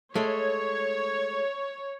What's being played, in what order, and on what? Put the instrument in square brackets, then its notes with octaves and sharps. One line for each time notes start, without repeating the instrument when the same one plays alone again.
[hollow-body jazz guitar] G#3 A3 [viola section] C#5